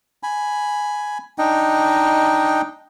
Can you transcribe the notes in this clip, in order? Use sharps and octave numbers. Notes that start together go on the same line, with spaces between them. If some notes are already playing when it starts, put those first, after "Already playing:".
G#5 B5
D4 D#4 D#5 G5